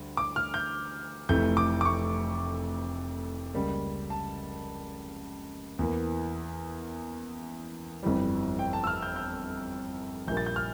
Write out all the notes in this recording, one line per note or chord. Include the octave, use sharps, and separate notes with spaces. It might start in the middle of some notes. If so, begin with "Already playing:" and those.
Already playing: D2 D3 G3
D6
F6
G6
F1 F2 E3 A3 G6
D6
D6
C#6
C#2 C#3 G3 A#3
A5
E2 E3 A#3
G1 F2 E3 G3
G5
A5
E6
F6
G6
G6
A#1 A#2 G3 A#3 G6
A6
G6
F6